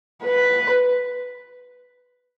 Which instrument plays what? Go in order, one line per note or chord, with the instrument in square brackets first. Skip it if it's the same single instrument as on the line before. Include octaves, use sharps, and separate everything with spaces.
[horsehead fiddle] B4